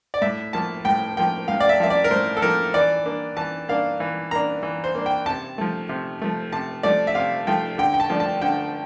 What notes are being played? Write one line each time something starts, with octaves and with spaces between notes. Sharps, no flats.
D5
A2 E5
F3 A#3 A5
A2 G5
F3 A#3 G5
A2 F5
D5
E5
F3 A#3 E5
D5
A#4
A2 C5
A4
F3 A#3 A#4
E3 D5
A#3 D4
E3 A5
A#3 D4 F5
E3
A#3 D4 A#5
E3
C5
A#3 D4
G5
C3 A5
F3 A3
C3
F3 A3
C3 A5
F3 A3 D5
E5
C3 F5
F3 A3 G5
D3 G5
G5
A5
F3 A3 D4
A5
D3 G5